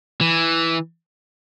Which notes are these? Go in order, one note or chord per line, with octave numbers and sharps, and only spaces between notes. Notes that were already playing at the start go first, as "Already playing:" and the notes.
E3